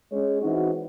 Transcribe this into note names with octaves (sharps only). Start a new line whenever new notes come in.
G#3 C#4 G#4 C#5
E3 C4 D#4 F#4